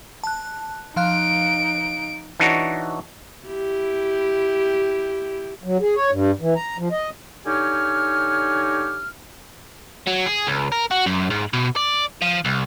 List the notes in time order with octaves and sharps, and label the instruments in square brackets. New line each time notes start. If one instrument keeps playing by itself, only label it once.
[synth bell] A5 F#6
[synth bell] F3 F5 F#6 [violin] D#4 D7
[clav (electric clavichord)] E3 D4 D#4 F#4 C#5
[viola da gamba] E4 G4
[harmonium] F#3
G#4
C#5
G2
E3
A#5
F3
D#5
[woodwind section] D3 D#4 G4 C#5 G#5 F6
[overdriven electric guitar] F#3
G#4
C#2
A#4
F#4
F#2
G#2
B2
D5
F3
C2